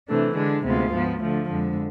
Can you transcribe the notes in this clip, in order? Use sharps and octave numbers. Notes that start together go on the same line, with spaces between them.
C3 E3 A3 D4
D3 G#3 D4
D2 C3 G#3 B3 F4
G#2 F3 B3
D3 F3 A3
F2 D3 G#3